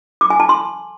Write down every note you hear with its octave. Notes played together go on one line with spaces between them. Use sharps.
D6
G#5
A5
C6